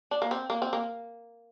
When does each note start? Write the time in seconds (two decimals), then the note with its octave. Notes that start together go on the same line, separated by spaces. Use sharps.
0.11 D4
0.22 A#3
0.31 C4
0.50 A#3
0.62 C4
0.73 A#3